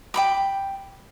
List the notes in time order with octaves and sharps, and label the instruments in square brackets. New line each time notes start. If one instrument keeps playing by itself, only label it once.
[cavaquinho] G5 B5 D6